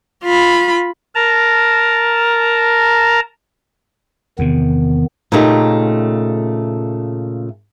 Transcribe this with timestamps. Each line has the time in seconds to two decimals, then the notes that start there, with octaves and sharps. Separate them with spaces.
0.24 F4 B5
1.15 A#4 A5 A#5
4.39 E2 C3 D#3 B3
5.32 A#2 C#3 A3 D#4 G4